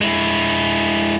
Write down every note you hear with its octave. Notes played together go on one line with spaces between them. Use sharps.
G#3 E4